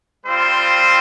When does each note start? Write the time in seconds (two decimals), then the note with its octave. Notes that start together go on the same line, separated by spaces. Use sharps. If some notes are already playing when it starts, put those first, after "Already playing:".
0.25 G3 C4 F4 C5